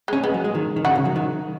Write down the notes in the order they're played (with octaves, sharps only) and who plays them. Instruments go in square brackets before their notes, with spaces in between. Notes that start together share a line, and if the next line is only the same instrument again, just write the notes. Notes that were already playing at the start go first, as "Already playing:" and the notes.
[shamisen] G#3
[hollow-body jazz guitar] C#4
[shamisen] G#3 [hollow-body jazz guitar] B3
[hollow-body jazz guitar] F#3
G#3
D#3
D#3
[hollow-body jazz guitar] C#3 [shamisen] F#4
[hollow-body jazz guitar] C#3
F#3
D#3